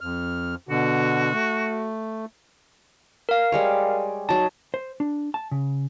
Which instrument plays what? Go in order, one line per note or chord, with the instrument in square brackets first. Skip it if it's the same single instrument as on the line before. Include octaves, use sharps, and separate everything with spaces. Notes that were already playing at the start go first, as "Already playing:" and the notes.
[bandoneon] F2 F6
[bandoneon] B2 D3 [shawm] F#4
[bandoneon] A3
[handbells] A#4 F5
[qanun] G3 G#3 C#5
[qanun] F#3 D#4 [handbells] A5
[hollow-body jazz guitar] C5
D4
A5
C#3